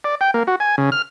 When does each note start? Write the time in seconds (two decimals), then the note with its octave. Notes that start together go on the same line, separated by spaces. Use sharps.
0.04 D5
0.21 G5
0.34 A#3
0.47 F#4
0.60 G#5
0.78 C#3
0.92 F6